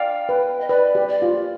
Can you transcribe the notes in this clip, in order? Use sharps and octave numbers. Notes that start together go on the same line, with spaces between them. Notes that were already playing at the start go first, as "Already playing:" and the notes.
Already playing: D5 F5 G5
B4
D#5
B4 D5
G4
D5
F4